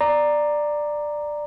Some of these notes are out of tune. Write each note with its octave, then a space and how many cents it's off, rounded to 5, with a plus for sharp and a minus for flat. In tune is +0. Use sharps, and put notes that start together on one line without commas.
D5 +10 A#5 +0